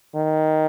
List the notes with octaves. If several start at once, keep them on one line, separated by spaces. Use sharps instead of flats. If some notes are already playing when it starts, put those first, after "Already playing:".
D#3